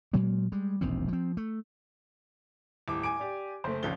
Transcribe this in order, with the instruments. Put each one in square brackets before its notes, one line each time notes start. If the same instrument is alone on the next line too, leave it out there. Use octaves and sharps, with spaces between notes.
[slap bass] A#2 F#3 G#3 A#3
G3 G#3
E1 A#1 D#3 C4
F3 C4
A3
[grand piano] D#1 D6 [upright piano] A2
[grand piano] G#5 D6 D7
[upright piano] G4 D5
[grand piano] F#1 [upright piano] A3 C5
[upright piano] G#1 C#2 G7 [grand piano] F3